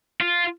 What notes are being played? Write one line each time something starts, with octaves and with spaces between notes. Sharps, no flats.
F4